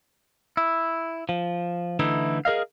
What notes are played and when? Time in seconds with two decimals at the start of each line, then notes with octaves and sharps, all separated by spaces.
0.57 E4
1.29 F3
1.99 D3 E3 A3 D#4 E4
2.45 G#4 A#4 D#5 F5